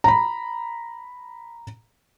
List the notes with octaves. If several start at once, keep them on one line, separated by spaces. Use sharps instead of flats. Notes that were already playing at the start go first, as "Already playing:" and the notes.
A#5 B5